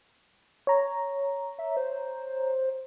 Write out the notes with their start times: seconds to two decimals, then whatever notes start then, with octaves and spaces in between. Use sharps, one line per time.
0.67 C#5 A#5
1.59 E5
1.77 C5